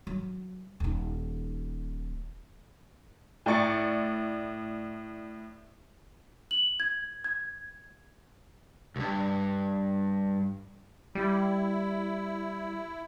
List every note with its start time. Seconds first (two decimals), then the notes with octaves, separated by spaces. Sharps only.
0.07 F#3
0.80 D#1 D#4
3.46 A2 D5 C#6 A6 C#7
6.51 F#7
6.80 G#6
7.24 G#6
8.96 C2 G2
11.15 G3 E4